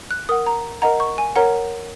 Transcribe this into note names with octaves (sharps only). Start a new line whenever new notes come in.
F#6
A#4 F#5 D#6
A#5
A#4 D#5 F#5 A#5
C#6
G#5
A#4 C#5 F#5 A#5